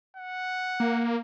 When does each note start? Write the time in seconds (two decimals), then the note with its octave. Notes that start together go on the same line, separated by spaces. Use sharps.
0.17 F#5
0.80 A#3